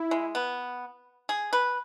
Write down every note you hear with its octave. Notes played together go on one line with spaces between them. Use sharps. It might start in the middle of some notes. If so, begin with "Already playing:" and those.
Already playing: E4
G#3
B3
G#4
B4